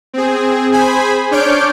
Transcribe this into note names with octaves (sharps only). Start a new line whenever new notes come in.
C4 G#4
G#4 C5 G#5 B5
D4 C#5 D5 F6 G6 D7